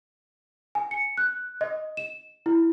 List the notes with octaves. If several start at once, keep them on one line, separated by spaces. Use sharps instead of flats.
G#5
C#7
F#6
D#5
E7
E4